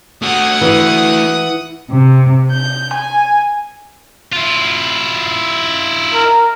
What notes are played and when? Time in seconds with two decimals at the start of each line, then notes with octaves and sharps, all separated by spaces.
0.22 A3 F#4 F#5 D#6
0.61 E3
1.89 C3
2.52 G6
2.94 G#5
4.33 E4 F4
6.14 A#4